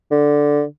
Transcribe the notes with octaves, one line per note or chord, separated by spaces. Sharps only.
D3